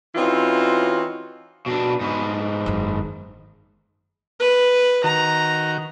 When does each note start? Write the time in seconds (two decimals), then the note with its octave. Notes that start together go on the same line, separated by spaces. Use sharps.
0.15 E3 C4 C#4 D#4 F4 F#4
1.66 B2 D4
2.01 G#2 B3
2.66 F#1 D#3
4.40 B4
5.04 D#3 F#4 A#5